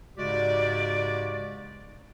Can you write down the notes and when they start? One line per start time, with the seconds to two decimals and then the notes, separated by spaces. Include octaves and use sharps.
0.17 G#2 C#3 G#3 F#4 G4 D5